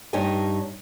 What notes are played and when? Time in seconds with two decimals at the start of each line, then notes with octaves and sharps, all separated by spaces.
0.13 G2 D#4 G4 C#5 G#5